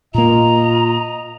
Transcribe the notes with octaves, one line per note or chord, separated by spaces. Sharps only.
A#2 A#3 F4 D#5 A#5